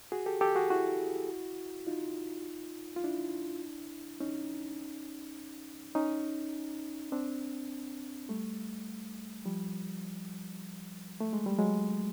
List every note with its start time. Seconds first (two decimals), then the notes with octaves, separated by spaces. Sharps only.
0.12 F#4 G#4
0.26 G4 A4
0.41 G4 A4
0.55 F#4 G#4
0.70 E4 F#4
1.87 D#4 F4
2.96 F4
3.04 D4 E4
4.20 C#4 D#4
5.95 C#4 D#4
7.12 C4 D4
8.29 G3 A3
9.45 F3 G3
11.20 A3
11.33 G#3
11.46 G3
11.58 F#3 G#3